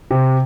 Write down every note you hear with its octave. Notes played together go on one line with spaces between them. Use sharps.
C3